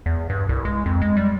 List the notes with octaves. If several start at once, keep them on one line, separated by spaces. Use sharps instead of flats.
E2
G2
C2
G#3
F2
G#3
G3